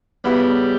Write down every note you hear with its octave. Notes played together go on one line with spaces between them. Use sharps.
C#3 F#3 G3 B3 E4